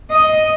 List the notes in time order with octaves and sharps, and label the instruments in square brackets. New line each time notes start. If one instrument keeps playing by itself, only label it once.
[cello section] D#5